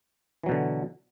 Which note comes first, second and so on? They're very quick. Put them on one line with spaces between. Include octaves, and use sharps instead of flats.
E3 F#3 B2 D3